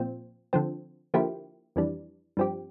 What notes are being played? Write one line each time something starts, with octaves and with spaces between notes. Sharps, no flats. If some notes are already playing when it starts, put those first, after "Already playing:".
Already playing: A#2 F3 C4
D3 F3 C4
D3 F3 A#3 E4 G4
F2 E3 G3 D4
G2 F3 C4 G4